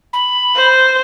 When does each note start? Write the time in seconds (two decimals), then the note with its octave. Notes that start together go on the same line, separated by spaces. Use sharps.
0.13 B5
0.56 C5